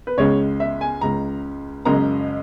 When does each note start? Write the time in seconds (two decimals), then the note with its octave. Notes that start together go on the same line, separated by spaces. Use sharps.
0.07 B4
0.18 C#2 C#3 G#3 C#5
0.60 E5
0.81 G#5
1.01 C#2 C#3 G#3 A#5
1.85 F#1 F#2 C#3 G#3 A#5